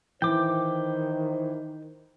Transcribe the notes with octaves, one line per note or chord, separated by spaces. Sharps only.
D#3 E3 C5 G5 D6